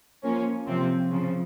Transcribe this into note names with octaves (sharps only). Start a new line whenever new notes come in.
F3 A#3 C#4
C3 F3 C4
C#3 F3